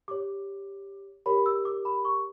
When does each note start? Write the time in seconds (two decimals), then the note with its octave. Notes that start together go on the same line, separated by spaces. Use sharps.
0.08 G4 C#5 D6
1.26 G4 A#4 C#5 B5
1.46 E6
1.65 D6
1.85 B5
2.05 C#6